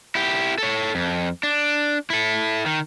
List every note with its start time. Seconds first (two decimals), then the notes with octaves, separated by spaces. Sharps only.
0.15 E4 G4
0.58 A4 C#5
0.95 F2
1.43 D4
2.10 E4 A4
2.66 D#3